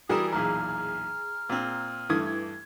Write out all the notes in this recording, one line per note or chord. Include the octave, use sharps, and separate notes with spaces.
E3 G3 F#4 G#4 A#4 D#6 E7
B1 E2 A#2 A#5 F6
A#2 C4
G2 E3 A3 D#6 G#6